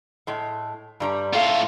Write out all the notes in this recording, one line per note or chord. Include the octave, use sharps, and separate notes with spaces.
A2 G#3
G2 G3 A#5
A2 A3 F4 F5